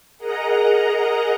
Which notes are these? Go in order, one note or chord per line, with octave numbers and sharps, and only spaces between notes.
G#4 A#4 D#5 F#5 A#5